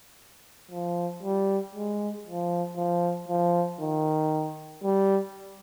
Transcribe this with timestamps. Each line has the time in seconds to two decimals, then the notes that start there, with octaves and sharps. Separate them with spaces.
0.71 F3
1.23 G3
1.75 G#3
2.27 F3
2.77 F3
3.29 F3
3.81 D#3
4.84 G3